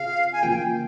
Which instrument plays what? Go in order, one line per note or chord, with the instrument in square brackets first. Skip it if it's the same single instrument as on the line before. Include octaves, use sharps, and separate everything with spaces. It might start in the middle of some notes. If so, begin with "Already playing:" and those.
Already playing: [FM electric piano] C#3 C4 F4 G#4 [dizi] F5
[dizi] G#5
[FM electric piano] C#3 F3 A#3 F4 [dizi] G5